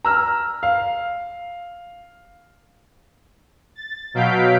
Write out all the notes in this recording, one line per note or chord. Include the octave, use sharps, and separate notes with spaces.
A#5 E6 F6
F5
A6
B2 F#3 F5 G6 B6 D7